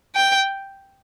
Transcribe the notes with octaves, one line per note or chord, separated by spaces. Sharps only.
G5